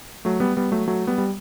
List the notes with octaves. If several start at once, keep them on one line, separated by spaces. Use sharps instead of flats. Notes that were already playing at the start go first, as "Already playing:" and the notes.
F#3 A3
G3 B3
G3 B3
F#3 A3
F#3 A3
G3 B3
G3